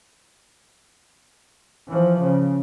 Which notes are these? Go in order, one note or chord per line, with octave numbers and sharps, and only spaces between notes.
E3 F3
C#3